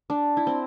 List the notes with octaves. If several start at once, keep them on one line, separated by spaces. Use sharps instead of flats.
D4
E4
C4